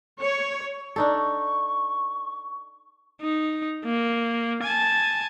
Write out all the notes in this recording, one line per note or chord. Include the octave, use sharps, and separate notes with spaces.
C#5
D4 D#4 A4 C#6
D#4
A#3
G#5 A5